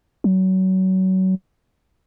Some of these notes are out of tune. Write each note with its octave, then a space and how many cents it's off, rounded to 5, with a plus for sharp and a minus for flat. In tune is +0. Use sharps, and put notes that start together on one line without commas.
F#3 +25